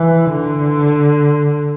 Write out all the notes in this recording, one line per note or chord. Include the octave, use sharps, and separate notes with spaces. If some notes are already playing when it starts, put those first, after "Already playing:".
Already playing: E3
D3